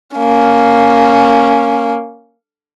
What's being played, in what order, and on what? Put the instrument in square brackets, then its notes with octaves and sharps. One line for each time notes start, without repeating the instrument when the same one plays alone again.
[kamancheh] A#3 C#4